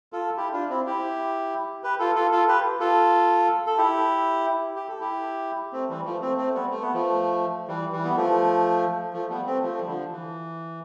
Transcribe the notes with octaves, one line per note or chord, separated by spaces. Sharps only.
F4 A4
E4 G4
D4 F4
C4 E4
E4 G4
G4 B4
F4 A4
F4 A4
F4 A4
G4 B4
F4 A4
A4
E4 G4
G4
A4
E4 G4
A3 C4
E3 G3
F3 A3
A3 C4
A3 C4
G3 B3
A3
B3
F3 A3
E3 G3
E3 G3
B3
F3 A3
F3 A3
G3 B3
A3 C4
F3 A3
G3
D3 F3
E3